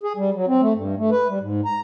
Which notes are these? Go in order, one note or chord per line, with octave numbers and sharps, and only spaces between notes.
G#4
G3
F#3
C4
A3
G2
A3
B4
G3
G#2
A#5